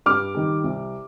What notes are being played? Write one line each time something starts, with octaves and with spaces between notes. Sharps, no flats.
G2 D6 F6
D#3 G3
C2